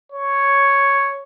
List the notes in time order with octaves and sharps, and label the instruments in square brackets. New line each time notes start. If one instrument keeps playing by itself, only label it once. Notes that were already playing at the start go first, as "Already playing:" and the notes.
[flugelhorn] C#5